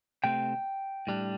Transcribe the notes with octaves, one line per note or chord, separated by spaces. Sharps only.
C3 A3 C4 G5
A2 G3 D4